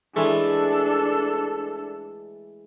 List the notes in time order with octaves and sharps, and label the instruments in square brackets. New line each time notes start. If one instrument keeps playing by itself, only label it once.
[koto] E3 G#3 A3 [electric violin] D4 A4